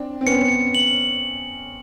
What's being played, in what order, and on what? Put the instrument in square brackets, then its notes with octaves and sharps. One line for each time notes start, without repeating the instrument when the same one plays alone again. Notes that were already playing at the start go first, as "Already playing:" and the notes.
Already playing: [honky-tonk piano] C4 D4
C4
[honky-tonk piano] B3 C#4 [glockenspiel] C#7
[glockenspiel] F#7